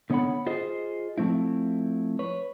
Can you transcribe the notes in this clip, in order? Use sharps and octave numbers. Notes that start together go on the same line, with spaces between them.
D3 B3 C#5 D#5 F#5 B5
F4 G#4 C5 D#5
F3 A3 C4 E4
B4 C#5